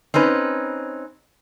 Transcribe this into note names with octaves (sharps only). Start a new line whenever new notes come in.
C4 C#4 D#4 B4